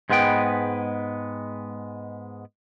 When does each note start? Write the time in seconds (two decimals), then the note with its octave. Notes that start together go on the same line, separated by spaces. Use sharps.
0.10 G#2 G#3 B3 B4 G5